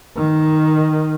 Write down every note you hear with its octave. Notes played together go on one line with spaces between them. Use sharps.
D#3